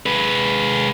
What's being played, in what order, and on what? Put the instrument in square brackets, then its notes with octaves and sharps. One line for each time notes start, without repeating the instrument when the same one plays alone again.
[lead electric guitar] G#3 B4